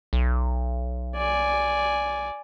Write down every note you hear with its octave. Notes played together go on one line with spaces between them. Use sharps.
B1
D5 G#5